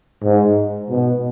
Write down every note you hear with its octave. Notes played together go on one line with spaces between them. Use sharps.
G#2
B2